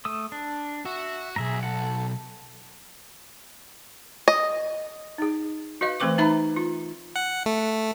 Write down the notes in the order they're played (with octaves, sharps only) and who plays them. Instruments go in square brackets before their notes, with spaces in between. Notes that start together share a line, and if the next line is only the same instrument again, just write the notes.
[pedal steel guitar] A3 D#6 E6
D4
[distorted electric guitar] F#4 [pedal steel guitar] E5
[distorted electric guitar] B1 G2 [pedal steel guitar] G#4 E5 A#5
[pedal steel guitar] A4 F#5
[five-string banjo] D#5
[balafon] D#4 G#4
F#4 B4 D#5 F5
E3 A3 C4 B4 C#6 D6
D#4 B4 E5 A#5 B5
F4
[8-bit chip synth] F#5
A3